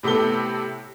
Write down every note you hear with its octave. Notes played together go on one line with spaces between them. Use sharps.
A2 C3 B3 A4 G7